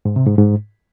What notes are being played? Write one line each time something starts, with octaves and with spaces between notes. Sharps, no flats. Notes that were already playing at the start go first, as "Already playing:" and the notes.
G#2
C3
G#2
G#2